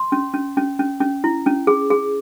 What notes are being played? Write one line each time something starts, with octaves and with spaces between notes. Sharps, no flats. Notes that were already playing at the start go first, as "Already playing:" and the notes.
Already playing: C6
C#4
C#4
C#4
C#4
C#4
E4
C#4
G#4
G#4